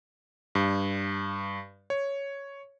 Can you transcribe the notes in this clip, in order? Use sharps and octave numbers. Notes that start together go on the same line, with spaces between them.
G2
C#5